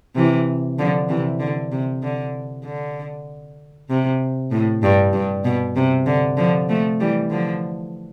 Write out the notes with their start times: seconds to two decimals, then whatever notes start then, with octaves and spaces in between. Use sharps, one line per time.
0.15 C3 E3
0.78 D3 F3
1.09 C3 E3
1.40 D3
1.72 C3
2.03 D3
2.65 D3
3.89 C3
4.51 A2
4.83 G2
5.13 G2
5.44 B2
5.76 C3
6.06 D3
6.37 D3 F3
6.69 F3 A3
7.00 E3 G3
7.30 D3 F3